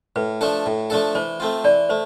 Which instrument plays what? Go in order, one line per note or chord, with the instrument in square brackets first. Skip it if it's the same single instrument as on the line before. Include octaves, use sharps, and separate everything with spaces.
[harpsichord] A2 [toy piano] B4
[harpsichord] F3 A3 D4 A4
A2
F3 A3 D4 A4
[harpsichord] E3 [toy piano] C5
[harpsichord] A3 C4 F4
[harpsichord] E3 [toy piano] D5
[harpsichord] A3 [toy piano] C5